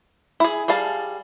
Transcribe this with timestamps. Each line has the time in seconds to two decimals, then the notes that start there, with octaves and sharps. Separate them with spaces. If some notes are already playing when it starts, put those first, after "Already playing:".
0.40 E4 G#4
0.68 G3 G#4 F5 A5